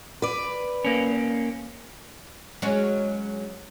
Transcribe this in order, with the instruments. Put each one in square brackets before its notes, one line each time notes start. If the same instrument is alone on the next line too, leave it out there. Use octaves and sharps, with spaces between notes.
[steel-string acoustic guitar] B4 D5
[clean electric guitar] A#3 C#4
[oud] F#3 G#3 C#4